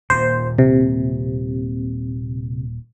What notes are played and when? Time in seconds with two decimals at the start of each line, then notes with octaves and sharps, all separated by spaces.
0.10 D#1 A#2 C5
0.58 C3